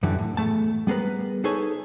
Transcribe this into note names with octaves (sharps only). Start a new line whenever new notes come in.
F#2 D3 E3 G3
A2
E2 F3 A3 A5
G3 B3 G#4 A#4 B4
D#4 G#4 A4 B4 C#5